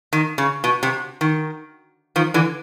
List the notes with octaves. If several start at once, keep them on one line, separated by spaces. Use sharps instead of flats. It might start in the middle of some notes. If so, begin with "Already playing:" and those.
D#3
C#3
B2
C3
D#3
D#3 F3
D3 E3